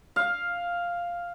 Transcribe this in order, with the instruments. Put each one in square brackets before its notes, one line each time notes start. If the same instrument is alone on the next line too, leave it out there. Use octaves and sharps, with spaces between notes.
[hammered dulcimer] F5